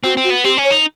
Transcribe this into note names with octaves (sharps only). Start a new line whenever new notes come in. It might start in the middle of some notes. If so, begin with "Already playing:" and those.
C4 F#4
C4
F#4
B3
C4 G4
C#4
C#5
D#4